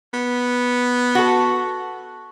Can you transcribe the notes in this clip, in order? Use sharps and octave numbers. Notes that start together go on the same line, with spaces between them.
B3
F#4 A4